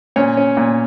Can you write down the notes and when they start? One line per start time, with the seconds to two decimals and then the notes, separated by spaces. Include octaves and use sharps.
0.16 A#2 C#4 C#5
0.37 C#4
0.57 A#2